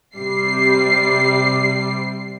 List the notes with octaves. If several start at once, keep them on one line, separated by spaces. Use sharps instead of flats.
C3 G3 C7